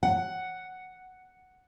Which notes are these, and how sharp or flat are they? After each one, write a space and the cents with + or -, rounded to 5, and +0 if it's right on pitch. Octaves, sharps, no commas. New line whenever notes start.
F#5 +5